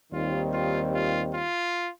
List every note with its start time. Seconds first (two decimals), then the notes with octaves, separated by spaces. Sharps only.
0.12 D#2 D#3 G3 C4 F4
0.52 F4
0.93 F4
1.34 F4